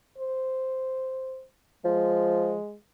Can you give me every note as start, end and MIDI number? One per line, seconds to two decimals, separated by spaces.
0.18 1.44 72
1.85 2.56 53
1.85 2.75 56